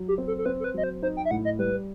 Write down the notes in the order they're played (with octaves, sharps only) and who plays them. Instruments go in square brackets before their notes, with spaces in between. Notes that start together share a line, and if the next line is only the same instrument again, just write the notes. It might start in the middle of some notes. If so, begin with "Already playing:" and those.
Already playing: [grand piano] F#3
[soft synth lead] G4
[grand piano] C4
[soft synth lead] A4
A4
[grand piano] C4 [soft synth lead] B4
[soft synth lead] A4
B4
[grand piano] F#3 [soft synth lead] D#5
[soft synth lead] C5
[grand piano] D#4 [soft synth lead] C5
[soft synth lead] G5
E5
[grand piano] A2 [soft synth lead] F#5
[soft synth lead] D#5
[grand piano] G3 [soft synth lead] B4